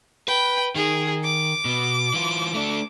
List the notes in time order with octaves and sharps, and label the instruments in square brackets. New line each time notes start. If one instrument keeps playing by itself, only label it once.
[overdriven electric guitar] B4 [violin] G5
[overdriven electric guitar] D#3 [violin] G#4
[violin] D6
[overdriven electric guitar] B2
E3 F4
A3 D4